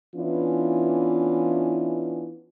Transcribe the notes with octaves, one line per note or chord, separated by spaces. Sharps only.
E3 B3 C#4 D4 E4 F4